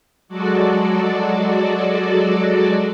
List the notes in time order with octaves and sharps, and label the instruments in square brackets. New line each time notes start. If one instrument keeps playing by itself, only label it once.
[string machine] F#3 G#3 F#4 A4 D5